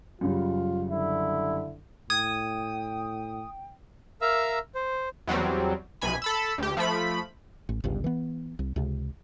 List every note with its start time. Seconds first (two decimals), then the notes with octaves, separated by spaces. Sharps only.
0.21 F#2 C#3 G3 F4
0.91 D3 E4
2.10 A2 G5 D#6 G#6
4.21 A#4 E5 F5 A#5 E6
4.75 C5
5.27 E2 F#3 G3 C4
6.01 B1 C3 G#5 B5
6.22 A4 B5 E6
6.58 D2 G4
6.77 F3 A3 B5
7.69 A1
7.84 G1 C#2 G2
8.04 E3 B3
8.59 C2
8.76 C#2 C3